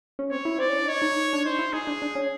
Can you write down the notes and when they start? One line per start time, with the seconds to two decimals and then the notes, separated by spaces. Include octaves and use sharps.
0.19 C#4
0.31 C4 C#5
0.45 E4
0.58 C4 D5
0.69 C#4
0.78 D4
0.88 D#4 C#5
1.02 D#4
1.33 D4
1.45 D#4 C5
1.59 E4
1.73 D#4 G#4
1.87 D4
2.02 D4
2.15 C#4